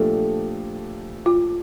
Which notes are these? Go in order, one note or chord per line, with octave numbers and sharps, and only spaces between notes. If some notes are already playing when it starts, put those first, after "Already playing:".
Already playing: A#2 F3 A3 D4 G4 A4
F4